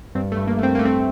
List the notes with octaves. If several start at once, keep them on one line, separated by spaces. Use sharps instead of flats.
G2 C4
A3
G2
A#3
A3 C4
A3 A#3
C4